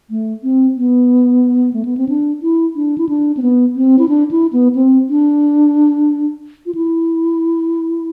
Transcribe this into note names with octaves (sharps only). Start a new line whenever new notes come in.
A3
C4
B3
A3
B3
C4
D4
E4
D4
E4
D4
C4
B3
C4
E4
D4
E4
B3
C4
D4
F4
E4